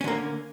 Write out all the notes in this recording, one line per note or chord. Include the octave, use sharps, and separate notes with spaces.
D3 A#3 C#4